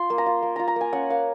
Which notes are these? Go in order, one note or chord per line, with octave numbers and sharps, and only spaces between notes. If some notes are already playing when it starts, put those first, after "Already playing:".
Already playing: F4 C6
A#3
A#5
F4
A#3
F4 A#5
A#5
A#3 G#5
C#4 F#5
A#3 F5